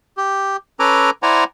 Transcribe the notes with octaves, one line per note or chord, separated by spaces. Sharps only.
G4
C#4 A4 B4 G#5 A#5 D6
E4 C5 D5 F#5 G#5 A#5